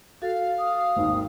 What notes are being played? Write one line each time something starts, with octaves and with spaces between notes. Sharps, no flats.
F#4 A4 F5 A6
D#6
G#1 D#2